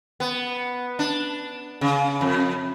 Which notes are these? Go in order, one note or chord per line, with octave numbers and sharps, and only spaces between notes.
B3
D4
C#3
F2